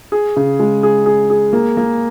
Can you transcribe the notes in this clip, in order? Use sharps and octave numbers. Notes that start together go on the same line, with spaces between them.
G#4
C#3
G#3
G#4
G#4
G#4
A#3
A#3